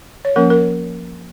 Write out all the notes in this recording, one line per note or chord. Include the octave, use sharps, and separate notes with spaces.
C#5
F3 A#3 C#4 A#4
A#4